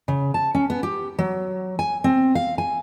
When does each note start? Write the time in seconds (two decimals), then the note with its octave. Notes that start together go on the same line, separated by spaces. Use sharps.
0.08 C#3
0.34 A5
0.55 C#4
0.70 B3
0.83 G4
1.19 F#3
1.79 G#5
2.04 C4
2.35 F5
2.58 G#5